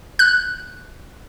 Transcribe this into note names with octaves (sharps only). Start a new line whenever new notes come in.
F#6